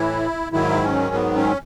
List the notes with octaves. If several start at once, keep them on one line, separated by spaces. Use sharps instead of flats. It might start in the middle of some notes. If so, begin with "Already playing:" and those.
Already playing: A2 E3 E4
G#2 D#3 F#3 E4
C#4
B3
C#4